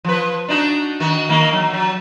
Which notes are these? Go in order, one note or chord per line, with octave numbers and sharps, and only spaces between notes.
F3 B4
D4 D#4 F#4
D#3 F#4
D#3 A#3
F#3
F#3